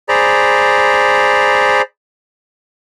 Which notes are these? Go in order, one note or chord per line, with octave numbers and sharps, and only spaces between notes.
G#4 C5 D5 A#5 B5